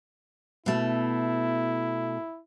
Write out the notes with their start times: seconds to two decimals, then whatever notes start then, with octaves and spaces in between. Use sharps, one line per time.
0.66 B2 A3 E4